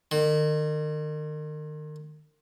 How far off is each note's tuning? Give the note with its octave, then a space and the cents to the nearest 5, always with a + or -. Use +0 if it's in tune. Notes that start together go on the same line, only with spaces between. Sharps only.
D#3 -35